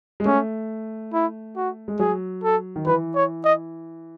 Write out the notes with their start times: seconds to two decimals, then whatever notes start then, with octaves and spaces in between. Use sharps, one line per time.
0.20 G#3
0.25 A3 C#4
1.13 E4
1.56 F#4
1.88 G#3
1.99 F#3 G#4
2.44 A4
2.76 D#3
2.87 E3 B4
3.16 C#5
3.45 D#5